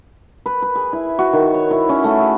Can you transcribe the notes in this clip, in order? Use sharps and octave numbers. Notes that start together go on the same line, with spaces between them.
B4
B4
G#4
E4
F#4
D#3
C#5
E4
C#4
A3
G#4